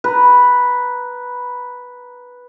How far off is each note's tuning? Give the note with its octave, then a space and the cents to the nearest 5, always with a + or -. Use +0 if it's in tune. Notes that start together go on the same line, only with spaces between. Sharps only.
B4 -5 A#5 +0